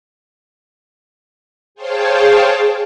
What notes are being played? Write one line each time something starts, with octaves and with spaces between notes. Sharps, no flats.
G#4 C5 C#5 F5 G5 A5